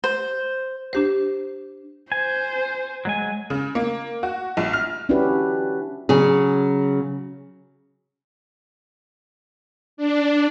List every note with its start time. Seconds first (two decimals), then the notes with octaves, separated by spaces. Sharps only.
0.04 C5
0.93 D4 G4 C5
2.12 C5 G#5
3.05 F#3 G#3 G#5
3.50 C#3
3.75 A#3
4.23 F#4
4.57 A#1
4.73 F6
5.09 C#4 D4 E4 F#4 G4 B4
6.09 C#3 F#3 G#4
9.97 D4